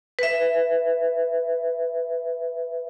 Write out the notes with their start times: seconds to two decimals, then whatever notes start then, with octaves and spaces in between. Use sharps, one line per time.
0.19 B4 E5